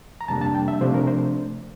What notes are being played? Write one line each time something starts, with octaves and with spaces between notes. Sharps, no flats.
A#5
F2 C3 G3 A#3 D4 A5
A5
G5
E5
C3 F3 A3 D4 C5
A#4
C5